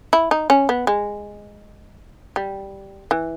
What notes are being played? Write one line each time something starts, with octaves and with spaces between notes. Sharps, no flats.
E4
D#4
C#4
B3
G#3
G3
E3